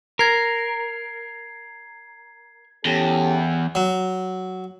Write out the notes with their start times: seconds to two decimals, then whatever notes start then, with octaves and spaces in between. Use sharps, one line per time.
0.19 A#4 G#6 C7
2.85 E2 C#4 G4 A4
3.75 F#3